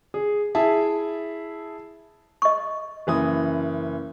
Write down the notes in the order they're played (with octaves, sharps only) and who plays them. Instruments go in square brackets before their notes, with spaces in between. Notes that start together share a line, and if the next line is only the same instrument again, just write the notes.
[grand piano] G#4
E4 G#4 E5 A5
[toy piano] D#5 C#6
[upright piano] F#1 E3 D#6